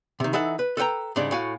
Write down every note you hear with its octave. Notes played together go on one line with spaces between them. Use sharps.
C3 D#3
E3 D#4 A4 E5 F#5
B4
A4 B4 C5 G5 A#5
G#2 C#3 G3 D4
A2 F#4 F5 G#5